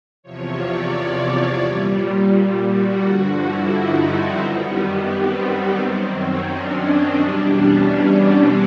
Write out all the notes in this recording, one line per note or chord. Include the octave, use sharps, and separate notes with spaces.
E2 C3 F3 C#5
D5
C#5
A#2 G3
F#4
G2 D3 F3
E4
D#4
C4
F#2 D#3 G3 B3
B3
C4
C4
F#2 D#3 F#3 C4
C#4
D4
D#4
E2 B2 G3 D4
C#4
C#4
C4